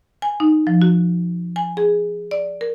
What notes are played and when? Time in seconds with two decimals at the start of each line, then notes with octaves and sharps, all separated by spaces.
0.22 G#5
0.40 D#4
0.67 F3
0.82 F#4
1.56 G#5
1.77 G#4
2.31 D5
2.61 A#4